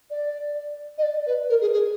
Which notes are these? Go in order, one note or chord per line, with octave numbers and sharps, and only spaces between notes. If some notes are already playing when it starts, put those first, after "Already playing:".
D5
D#5
D5
B4
A#4
G#4
G#4